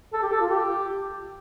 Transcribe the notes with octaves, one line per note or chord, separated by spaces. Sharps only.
A4
G4
A4
F4
G4